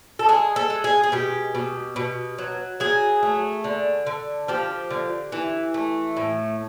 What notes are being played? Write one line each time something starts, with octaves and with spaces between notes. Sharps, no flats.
A4
G#3 G#4
A4
G#3
G#4
G#4
B2 G4
B2
B2
F#3
F#3 G#4
A3
D3
D3
F3 G4
D3
E3
A3
A2